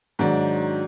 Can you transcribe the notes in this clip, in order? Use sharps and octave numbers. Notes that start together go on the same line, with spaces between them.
G#2 D#3 F#3 D4